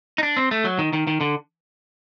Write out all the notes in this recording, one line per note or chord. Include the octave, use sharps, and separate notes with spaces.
D#4
D4
C4
A3
F#3
D#3
D#3
D#3
D3